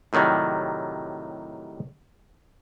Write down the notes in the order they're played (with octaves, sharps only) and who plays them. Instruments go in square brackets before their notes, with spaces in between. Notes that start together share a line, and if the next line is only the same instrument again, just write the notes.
[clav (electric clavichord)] A2 C3 D#3 F#3 G3